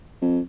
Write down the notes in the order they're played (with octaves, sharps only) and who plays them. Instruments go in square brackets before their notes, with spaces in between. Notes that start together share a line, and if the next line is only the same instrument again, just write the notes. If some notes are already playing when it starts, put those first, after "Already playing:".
[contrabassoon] F2